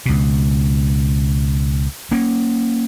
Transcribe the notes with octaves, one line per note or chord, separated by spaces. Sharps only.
C#2 B2
A#3 C#4